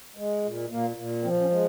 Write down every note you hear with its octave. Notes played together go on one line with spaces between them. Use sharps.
G#3
A#2
A#2 A#3
A#2
F3 C4
C#4
G#3